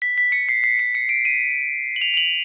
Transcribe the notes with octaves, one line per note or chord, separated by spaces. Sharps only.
B6
B6
C#7
C7
C7
C#7
C#7
D7
D#7
F#7
F7
F7
F#7